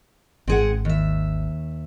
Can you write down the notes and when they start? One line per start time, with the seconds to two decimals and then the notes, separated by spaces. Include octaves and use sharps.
0.48 G#1 C4 G#4 F#5
0.85 D#2 E5